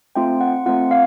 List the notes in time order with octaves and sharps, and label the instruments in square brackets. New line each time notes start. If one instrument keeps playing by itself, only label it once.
[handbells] A3 C4 F4 G5
F#5
A3 C4 F4 F#5
F5